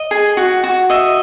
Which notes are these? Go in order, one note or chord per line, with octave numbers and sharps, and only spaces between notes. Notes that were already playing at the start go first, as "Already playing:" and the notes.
Already playing: D#5
G#4
F#4
F#4
D#5 E5